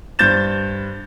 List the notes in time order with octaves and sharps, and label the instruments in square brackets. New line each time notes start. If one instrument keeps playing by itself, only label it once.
[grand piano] G2 C5 G6 A6 E7